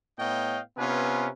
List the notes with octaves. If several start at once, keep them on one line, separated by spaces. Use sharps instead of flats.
A2 B3 C#5 D#5 F5 G5
C3 B3 C#4 F4 B4 G#5